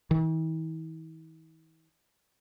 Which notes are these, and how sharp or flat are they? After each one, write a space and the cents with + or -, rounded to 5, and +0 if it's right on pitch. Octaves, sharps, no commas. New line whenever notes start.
E3 -45